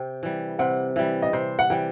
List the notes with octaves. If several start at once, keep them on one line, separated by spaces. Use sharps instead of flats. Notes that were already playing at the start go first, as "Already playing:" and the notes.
Already playing: C3 G5
E3 G3
C3 F#5
E3 G3 E5
D#5
C3 C5
F#5
E3 G3 G5